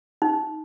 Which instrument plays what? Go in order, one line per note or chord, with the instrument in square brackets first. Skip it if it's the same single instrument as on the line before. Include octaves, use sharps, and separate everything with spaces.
[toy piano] D#4